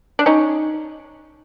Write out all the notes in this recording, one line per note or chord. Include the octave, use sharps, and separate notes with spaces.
D4
C#4 D#4